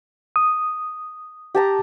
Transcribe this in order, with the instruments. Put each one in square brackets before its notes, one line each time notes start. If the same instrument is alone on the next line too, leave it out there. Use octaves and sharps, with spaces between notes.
[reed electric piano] D#6
[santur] G4 A5 A#5